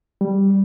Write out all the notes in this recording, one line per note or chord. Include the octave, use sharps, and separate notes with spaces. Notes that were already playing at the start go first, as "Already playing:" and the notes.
G3